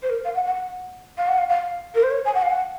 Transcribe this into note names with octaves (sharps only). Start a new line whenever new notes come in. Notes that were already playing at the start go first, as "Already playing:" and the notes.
C5
A#4
F5
F#5
F#5
F5
F#5
F5
F5
A#4
C5
C#5
G#5
F#5
F5
F#5